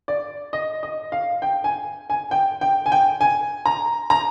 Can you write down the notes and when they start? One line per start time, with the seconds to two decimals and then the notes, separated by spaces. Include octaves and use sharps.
0.08 D5
0.53 D#5
0.83 D#5
1.12 F5
1.42 G5
1.64 G#5
2.10 G#5
2.31 G5
2.61 G5
2.86 G#5
2.92 G5
3.21 G#5
3.66 A#5
4.10 A#5